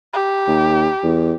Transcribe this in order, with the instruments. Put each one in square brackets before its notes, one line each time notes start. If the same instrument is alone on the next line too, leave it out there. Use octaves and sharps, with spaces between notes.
[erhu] G4
[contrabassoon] D#2
E2